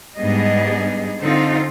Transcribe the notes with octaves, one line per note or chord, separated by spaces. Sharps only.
G#2 G3 B3 D4 G#4 D#5
D3 C4 D#4 F4